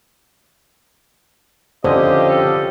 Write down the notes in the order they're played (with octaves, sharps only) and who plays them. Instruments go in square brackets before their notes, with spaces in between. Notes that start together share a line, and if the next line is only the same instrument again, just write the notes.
[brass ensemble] F2 F4 G4 [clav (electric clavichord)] D3 C#4 [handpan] C5 [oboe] D#5
[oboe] A4